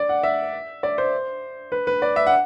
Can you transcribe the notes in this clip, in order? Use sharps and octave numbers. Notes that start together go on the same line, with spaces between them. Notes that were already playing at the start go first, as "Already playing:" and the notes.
Already playing: D5
F#5
E5
D5
C5
B4
B4
D5
E5
F#5